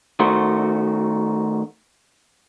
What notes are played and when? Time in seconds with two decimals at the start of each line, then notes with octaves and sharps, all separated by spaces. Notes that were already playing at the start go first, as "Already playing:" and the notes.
0.20 D#3 A3 F#4 C5